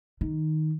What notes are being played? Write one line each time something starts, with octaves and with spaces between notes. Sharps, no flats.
D#3